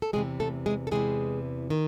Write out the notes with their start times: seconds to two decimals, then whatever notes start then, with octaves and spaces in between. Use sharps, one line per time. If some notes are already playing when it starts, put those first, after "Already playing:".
0.02 A4
0.13 E2 C3 E3 G#3 G#4
0.40 A3 A4
0.66 G#3 G#4
0.87 A4
0.91 E2 C3 E3 G#3 G#4
1.70 D#3